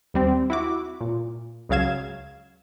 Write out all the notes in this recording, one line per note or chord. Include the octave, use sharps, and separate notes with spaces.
D#2 G3 C4
E4 F#4 D6
A#2
C#2 C#3 F#3 F5 G#6 E7